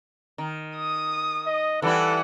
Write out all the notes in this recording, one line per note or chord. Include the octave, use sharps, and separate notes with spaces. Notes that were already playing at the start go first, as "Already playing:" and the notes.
D#3
D#6
D#5
E3 G3 E4 A4 F#5